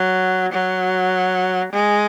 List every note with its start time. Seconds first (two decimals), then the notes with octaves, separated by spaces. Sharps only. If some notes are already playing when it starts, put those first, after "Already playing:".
Already playing: F#3
0.53 F#3
1.73 G#3